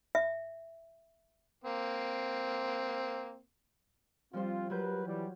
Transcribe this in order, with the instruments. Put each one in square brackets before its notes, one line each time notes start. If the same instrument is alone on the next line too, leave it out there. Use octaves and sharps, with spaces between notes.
[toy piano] E5
[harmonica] A#3 C4
[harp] F3 G3 C5 [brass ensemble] C4 F4
[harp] F#3 F4 G6 [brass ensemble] G4 A#4 B4
[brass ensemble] E3 G3